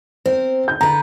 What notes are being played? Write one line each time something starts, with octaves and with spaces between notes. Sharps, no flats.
C4 A#4 C5
G6
D3 B4 A#5